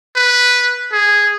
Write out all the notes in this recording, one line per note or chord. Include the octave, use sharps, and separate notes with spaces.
B4
G#4